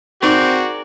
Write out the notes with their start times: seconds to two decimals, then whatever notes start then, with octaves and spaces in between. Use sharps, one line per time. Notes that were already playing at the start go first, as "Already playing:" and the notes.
0.23 C4 D#4 F#4 G#4 A#4 D5 C#6